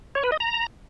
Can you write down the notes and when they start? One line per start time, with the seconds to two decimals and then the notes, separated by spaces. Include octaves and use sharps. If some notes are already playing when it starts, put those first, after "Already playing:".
0.15 C#5
0.24 B4
0.32 D#5
0.40 A#5